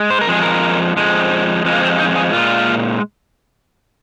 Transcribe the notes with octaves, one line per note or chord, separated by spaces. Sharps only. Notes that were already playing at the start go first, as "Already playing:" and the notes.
Already playing: G#3
C5
A#4
F2 F3 G#3 G#4
A#4
F2 F3 G#3
F2 F3 G#3
A#3
C4
D#4
G#4
A#2 G#3 F4